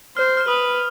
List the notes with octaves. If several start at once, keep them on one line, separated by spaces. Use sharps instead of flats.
C5 F6
F6
B4 D#6